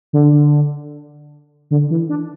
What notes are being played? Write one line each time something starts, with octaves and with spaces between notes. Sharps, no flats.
D3
D3
E3
D4